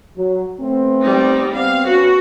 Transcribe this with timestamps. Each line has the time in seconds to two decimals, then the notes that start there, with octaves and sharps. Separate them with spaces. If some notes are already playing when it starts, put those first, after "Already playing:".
0.17 F#3
0.60 A3 B3 C4
1.01 G3 D#4
1.54 B3 C4 F5
1.87 B3 C#4 F#4 B4